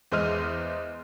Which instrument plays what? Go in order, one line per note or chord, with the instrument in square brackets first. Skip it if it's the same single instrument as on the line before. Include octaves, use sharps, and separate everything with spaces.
[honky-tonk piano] E2 G#3 C5 D#5 F6 D#7